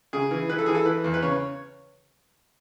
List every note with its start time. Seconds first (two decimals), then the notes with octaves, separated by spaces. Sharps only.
0.13 C#3 G#4
0.31 E3
0.49 E3 B4
0.58 A4
0.66 E3 G#4
0.75 A4
0.85 E3 B4
1.04 E2
1.14 B4
1.22 C#3 C#5